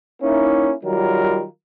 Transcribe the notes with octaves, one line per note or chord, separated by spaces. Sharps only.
A#3 C#4 D#4 E4
D#3 F#3 G3 F4 A#4